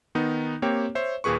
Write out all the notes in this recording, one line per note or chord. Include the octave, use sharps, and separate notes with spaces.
D#3 B3 D#4
A#3 C4 G4 C#5 G5
C5 C#5 E5
D#2 A#2 G#4 B4 C#6